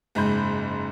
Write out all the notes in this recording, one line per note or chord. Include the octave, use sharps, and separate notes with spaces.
F#1 G#2 B5 G6